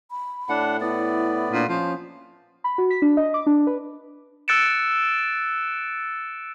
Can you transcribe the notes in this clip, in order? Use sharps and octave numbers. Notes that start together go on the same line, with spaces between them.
B5
A2 D4 F#5
B3 E4 D5
A#2 D4
F3 C#4
B5
F#4
B6
D4
D#5
D6
D4
B4
E6 F#6 A6 C#7 D7 E7